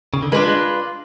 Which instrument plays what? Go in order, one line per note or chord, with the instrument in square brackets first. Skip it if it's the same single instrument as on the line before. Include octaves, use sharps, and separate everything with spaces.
[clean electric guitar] C#3
D3
[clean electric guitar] G#3 [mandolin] D4 F4 B4
[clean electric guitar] G#3